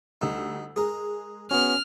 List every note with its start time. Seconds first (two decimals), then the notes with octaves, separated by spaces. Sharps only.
0.21 D2 G3 D#4 E6
0.76 G#3 G#4 A#4
1.51 B3 C#4 F#4 F6